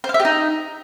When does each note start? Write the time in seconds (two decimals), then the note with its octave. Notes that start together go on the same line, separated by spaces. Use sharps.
0.04 C5
0.09 F5
0.14 E5
0.20 G4
0.25 D#4